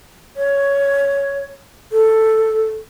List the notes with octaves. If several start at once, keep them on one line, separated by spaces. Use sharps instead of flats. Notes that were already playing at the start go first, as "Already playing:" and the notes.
C#5
A4